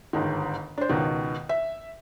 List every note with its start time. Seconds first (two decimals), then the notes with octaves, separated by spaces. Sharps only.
0.13 G1 G#2 D#3
0.78 D4 C5
0.89 C#2 B2 D#3
1.49 E5